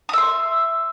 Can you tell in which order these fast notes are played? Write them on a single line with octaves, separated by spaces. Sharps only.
D#6 E5 C6